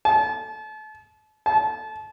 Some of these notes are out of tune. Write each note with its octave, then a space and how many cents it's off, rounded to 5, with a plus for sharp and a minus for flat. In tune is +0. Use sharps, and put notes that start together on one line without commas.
A5 -35
A5 -30